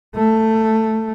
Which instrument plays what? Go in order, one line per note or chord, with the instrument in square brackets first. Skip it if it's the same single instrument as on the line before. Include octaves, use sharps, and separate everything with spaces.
[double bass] A3